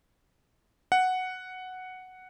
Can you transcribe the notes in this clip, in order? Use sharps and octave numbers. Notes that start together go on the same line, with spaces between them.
F#5